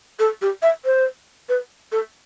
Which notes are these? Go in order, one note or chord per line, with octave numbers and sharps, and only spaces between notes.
A4
G4
E5
C5
B4
A4